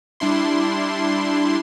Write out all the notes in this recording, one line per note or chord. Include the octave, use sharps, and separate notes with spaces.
G3 D4 E4 C6